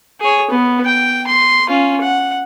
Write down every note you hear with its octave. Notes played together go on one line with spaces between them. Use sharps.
G#4 C#5
B3
G5
C6
C#4 F4
F#5